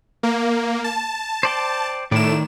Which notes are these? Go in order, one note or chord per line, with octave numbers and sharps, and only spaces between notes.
A#3
A5
C5 D5 G5
A2 D#3 D5 E7